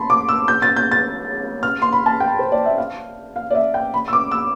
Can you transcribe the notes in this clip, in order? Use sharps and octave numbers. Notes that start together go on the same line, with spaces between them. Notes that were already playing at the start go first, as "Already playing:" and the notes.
Already playing: A5 B5 C6
D6
E6
G6
A6
G6
A6
F6
C6
B5
A5
G5
C5
D5
E5
F5
F5
D5
E5
G5
B5
E6
D6
E6